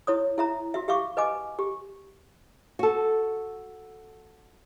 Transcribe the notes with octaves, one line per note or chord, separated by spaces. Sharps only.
E4 C#5 D#6
E4 E5 A#5
F#4 E5
G4 E5 F5 C#6 D6
B4 D#5 G#5 D6
G4
F#4 A4